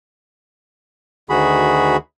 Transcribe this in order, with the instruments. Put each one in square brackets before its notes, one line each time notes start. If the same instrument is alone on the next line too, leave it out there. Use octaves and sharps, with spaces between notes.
[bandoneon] D2 D#3 F#4 G#4 B5